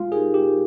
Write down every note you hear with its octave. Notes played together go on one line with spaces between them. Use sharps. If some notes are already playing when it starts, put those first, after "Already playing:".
Already playing: G#3 F4
D#4 G4 G#4 A#4
G4